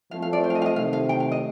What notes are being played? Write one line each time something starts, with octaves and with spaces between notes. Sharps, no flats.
F3 A3 C4 F5
F5
D5
C5
F5
D#5
F5
D#5
C3 D#3 A3 F5
F5
G5
F5
D#5